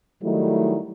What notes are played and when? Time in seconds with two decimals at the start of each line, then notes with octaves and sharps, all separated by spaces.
0.22 D#3 F#3 G3 A3 D#4 E4